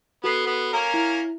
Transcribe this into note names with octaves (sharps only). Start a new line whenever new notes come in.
B3 F#4 A4 C7
B3
A#3 C#4 A#4
E4